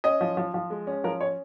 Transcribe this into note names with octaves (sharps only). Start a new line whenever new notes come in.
C#4 D#5
F3
F3
F3
G#3
C#4
F3 A#4
C#4 C#5